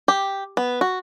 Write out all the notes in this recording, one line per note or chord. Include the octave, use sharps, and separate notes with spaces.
G4
B3
F#4